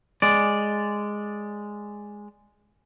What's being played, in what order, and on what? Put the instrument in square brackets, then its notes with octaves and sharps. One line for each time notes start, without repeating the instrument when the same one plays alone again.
[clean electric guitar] G#3 D5